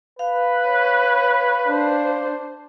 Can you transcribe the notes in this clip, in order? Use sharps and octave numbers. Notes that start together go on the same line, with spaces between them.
B4 F5
C#5
D4 C5